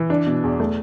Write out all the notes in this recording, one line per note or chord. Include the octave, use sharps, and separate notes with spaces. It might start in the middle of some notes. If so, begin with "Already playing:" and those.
Already playing: E3
D4
B2
E2
A3